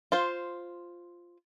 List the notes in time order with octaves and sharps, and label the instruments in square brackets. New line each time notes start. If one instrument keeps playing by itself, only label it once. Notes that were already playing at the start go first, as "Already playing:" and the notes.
[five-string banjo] F4 C5